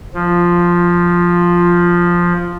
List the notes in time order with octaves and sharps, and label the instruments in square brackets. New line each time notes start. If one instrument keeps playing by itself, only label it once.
[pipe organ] F3 [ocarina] F4